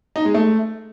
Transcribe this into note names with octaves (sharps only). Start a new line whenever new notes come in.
D#4
G#3
A3